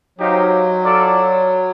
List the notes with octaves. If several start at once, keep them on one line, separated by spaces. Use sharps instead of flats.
F#3 D#4 G4 C5 F5
F4 A4 D5